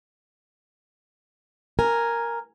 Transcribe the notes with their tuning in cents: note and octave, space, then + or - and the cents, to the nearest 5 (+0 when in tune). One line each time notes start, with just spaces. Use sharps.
A#4 +0 G#5 +0